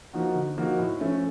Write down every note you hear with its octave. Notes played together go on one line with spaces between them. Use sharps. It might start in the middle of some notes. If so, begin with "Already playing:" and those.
F3 A#3 D#4 F#4
D3
F3 A#3 D#4 F#4
A2
F3 A3 C#4